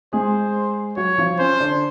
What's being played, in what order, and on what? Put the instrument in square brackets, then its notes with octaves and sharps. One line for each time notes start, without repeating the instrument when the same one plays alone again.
[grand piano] G#3 G#4 [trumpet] C5
[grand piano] F#3 F#4 [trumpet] C#5
[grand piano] F3 F4
[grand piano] C#4 [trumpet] C5
[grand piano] D3 D4